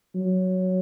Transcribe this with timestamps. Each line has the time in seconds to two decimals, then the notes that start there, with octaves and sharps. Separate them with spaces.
0.15 F#3